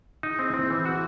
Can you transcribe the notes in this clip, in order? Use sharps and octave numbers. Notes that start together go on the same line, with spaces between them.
D#4 E4 G#4
C4
C4
E3
F#4